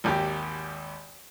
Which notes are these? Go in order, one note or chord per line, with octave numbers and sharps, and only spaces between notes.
G#1 D#2 G4